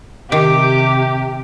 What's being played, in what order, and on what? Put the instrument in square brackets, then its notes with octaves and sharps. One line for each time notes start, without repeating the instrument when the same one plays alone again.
[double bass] C3 [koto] D#3 [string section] G4 [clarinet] D6